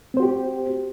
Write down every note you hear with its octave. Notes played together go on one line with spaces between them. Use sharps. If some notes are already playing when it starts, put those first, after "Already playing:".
C4 F#4 G4 C5